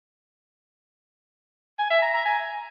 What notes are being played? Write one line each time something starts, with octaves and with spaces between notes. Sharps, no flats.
G#5
E5
A#5
A#5
G#5